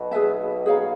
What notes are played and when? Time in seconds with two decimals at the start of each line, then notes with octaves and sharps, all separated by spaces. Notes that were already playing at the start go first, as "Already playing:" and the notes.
Already playing: B1 B2
0.11 G#4 B4 E5 A5
0.66 G#4 C#5 F5 A#5